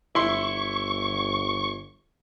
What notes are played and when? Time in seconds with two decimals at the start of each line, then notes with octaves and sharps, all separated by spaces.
0.15 G1 E4 C6 C#6